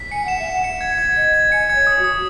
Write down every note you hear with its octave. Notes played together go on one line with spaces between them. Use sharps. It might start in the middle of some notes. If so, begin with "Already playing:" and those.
Already playing: B6
G#5 C#7
F#5 E7
E5
E7
F#5
C#7
G#6
G#6
D#5 G#6
G#6
G#5 C#7
G#6
C#5
D#6
F#4
D#6